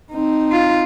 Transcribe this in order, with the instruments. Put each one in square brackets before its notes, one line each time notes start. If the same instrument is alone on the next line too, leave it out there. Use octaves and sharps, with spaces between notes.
[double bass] C4 D#4
[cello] F4